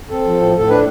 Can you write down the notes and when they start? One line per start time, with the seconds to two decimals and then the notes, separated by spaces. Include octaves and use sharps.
0.10 C4 A4
0.25 F3
0.41 A2
0.55 A2 A4
0.69 D4 B4